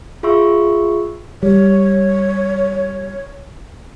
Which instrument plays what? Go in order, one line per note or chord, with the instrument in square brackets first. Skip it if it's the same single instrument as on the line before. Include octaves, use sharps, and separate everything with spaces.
[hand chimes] F4 G#4 E5 C6 C#6 E6
[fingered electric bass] G3 [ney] C#5